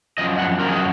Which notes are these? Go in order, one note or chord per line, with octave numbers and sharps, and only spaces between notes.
F#2 F3 D#5
F#5
F#2 F3 A#4
G#4
F#4